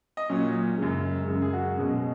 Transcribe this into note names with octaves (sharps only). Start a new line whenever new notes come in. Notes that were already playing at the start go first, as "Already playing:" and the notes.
D#5
A#2 F#3 C#4
F#2 C#3 G#3
F#2 C#3 G#3
G#4
F#4
B2 G#3 C#4 G#4